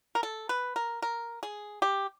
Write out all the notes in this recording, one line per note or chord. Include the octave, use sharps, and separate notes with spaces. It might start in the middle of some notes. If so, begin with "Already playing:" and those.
A#4
A4
B4
A#4
A#4
G#4
G4